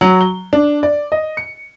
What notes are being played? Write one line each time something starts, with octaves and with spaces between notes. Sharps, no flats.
F#3
G7
D4
D5
D#5
C#7